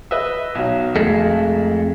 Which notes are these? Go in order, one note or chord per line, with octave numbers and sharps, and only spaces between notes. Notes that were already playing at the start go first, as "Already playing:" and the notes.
B4 D#5 E5
B1 F#3
F2 G#3 A3